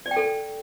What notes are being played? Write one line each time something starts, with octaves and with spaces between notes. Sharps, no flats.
D5
G5
A4